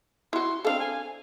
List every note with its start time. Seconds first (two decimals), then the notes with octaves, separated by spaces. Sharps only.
0.33 E4 F#4 C6
0.65 C4 D4 A4 F5
0.80 G#5